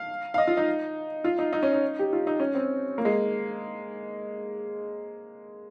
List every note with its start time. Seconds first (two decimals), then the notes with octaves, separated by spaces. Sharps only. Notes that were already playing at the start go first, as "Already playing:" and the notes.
Already playing: F5
0.34 F5
0.38 D#5
0.47 F4
0.57 D#4
1.24 F4
1.39 D#4
1.53 D#4
1.63 C#4
1.73 D#4
1.99 G4
2.13 F4
2.27 D#4
2.40 C#4
2.55 C4
2.98 A#3
3.05 G#3